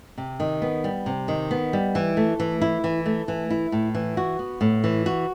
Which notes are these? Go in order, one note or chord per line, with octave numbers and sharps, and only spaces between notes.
C3
D#3
B3
G3
C3
D#3
B3
G3
E3
A3
E3
E4
E3
A3
E3
E4
A2
E3
F#4
B3
A2
E3
F#4